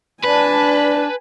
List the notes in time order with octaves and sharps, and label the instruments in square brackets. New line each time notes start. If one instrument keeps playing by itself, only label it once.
[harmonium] D4 [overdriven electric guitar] B4 [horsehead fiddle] G#5 A5